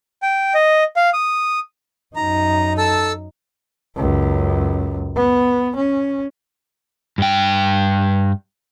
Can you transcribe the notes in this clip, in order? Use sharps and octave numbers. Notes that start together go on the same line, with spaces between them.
G5
D#5
F5
D#6
F#2 D#4 A#5
A4 A5 E6
C#2 F#2
B3
C#4
G2 G5